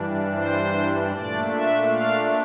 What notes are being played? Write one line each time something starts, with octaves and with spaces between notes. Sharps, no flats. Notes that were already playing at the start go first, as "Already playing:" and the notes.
Already playing: G2 E3 G3 D4
C5
A#2 A3 D4 D5
E5
F5